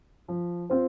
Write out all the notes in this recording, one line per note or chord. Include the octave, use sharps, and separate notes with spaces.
F3
C4 F4 C5